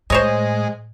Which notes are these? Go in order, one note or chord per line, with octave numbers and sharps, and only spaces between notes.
A2 G#3 C5 C#5 D#5